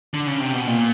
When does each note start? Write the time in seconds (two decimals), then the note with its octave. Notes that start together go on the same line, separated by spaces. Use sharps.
0.14 D3
0.27 C#3
0.40 C3
0.54 B2
0.67 A#2